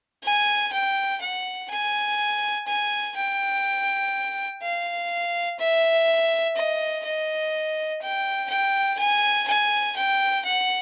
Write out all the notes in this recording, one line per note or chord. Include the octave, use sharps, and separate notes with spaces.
G#5
G5
F#5
G#5
G#5
G5
F5
E5
D#5
D#5
G5
G5
G#5
G#5
G5
F#5